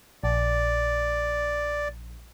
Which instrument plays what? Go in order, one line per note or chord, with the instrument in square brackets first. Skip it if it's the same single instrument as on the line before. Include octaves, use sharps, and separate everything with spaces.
[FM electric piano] A#1 [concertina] D5